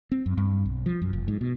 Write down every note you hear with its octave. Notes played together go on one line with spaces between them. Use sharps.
C4
F#2
G2
B1
F3
F#2
F1
G#2
B2